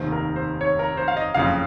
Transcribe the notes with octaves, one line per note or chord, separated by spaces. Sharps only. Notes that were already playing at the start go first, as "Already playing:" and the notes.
Already playing: F1 D#2 D#3 C5
A#4
C5
C#5
A#4
C5
F5
D#5
F#1 F2 C#3 F5